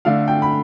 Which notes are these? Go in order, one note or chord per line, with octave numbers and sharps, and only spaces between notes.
D3 A3 D4 F5
G5
B5